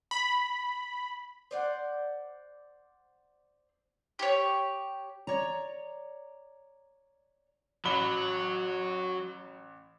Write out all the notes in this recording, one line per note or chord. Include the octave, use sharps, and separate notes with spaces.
B5
C5 D5 F#5
G4 C#5
C#5 D5 A#5
A1 F#3 B5 G7